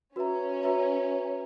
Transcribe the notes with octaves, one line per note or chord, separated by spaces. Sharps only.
C#4 F#4 B4 E5 A#5
F#4 B4 E5 A#5